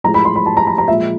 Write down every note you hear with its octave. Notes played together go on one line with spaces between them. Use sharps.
A2 F3 G#3 A#5
B5
C6
B5
A5
A#5
A#5
A#5
A#2 F3 G#3 E5